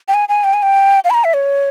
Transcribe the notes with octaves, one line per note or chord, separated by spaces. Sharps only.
G5
G#5
G#5
G5
G#5
G5
F5
B5
A#5
E5
C#5